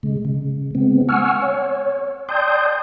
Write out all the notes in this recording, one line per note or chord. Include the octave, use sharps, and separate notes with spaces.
C#3 G#3
C#3
G#3 B3 C4
F#5 G#5 C#6 E6 F6
C#5
D5 G5 A5 C6 D#6 G6